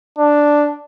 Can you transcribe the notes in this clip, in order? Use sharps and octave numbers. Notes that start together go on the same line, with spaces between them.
D4